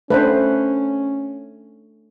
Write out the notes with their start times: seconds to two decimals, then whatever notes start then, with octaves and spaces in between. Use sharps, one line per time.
0.10 A3 C#4 D4 B4 C5